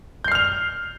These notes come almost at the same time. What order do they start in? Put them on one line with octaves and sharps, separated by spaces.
G6 C7 F6 F7